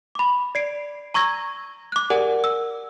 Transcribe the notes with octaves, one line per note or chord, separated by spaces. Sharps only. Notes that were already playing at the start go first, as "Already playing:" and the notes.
B5 D6
D5 C7 D7
A#5 C#6 E6 G#6 A#6 G7
D6 F#6
G4 G#4 A#4 D5 F#5 G#5
E6